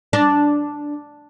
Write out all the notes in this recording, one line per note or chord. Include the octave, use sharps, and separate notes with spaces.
D4